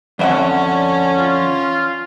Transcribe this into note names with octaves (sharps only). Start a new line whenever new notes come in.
F2 D3 C#4 E5 F#5
F4